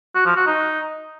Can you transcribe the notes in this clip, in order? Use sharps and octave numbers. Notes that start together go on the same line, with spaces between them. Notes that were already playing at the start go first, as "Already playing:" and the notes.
F#4
F3
F#4
D#4